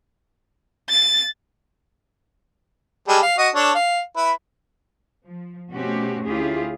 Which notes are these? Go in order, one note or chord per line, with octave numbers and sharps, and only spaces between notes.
A6
G3 G#3 A4
F5
F#4 D#5
D4 A4 C#5
F5
E4 B4
F3
B2 A3 C4 C#4 F#4 G4
D2 C#4 E4 F4 G4 G#4